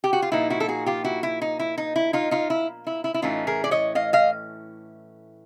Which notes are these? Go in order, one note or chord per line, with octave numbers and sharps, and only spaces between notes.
G4
F#4
F4
A#2 F3 A#3 D#4 E4
E4 F#4
A4
F#4 G#4
F4 G4
E4 F#4
E4
D#4
E4
D#4
E4
D#4 F4
D#4 F4
E4
E4
E4
E4
A2 E3 A3 C#4 D#4 F4
G#4 A#4
D5
C#5 D#5
D#5 F5
D#5 F5